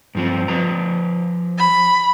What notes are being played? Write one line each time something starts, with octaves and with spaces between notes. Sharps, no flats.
G2 F3 C4
F3 B4 A#5
B5